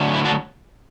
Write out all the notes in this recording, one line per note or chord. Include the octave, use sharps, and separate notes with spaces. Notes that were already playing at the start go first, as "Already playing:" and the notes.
Already playing: D3 F#3 A3
E4
D4 F#4